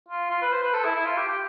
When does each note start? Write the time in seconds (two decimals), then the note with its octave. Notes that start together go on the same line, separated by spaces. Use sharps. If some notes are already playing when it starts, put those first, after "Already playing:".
0.09 F4
0.30 F4
0.42 B4
0.53 C5
0.63 B4
0.74 A4
0.84 E4
0.95 E4
1.06 F4
1.17 G4
1.28 G4